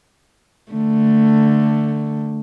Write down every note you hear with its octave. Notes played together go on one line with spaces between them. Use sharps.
D3 A3